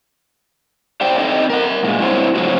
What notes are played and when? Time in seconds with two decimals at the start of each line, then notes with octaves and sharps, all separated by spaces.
1.01 G4 C5 D5 G5
1.18 C4 D#4 A4 D#5
1.50 A#4 F#5
1.83 G2 A#2 G#3
2.00 C4 E4 F#4 G4 C5 C#5
2.35 C#3 F3 F#3 A3 C4 F#4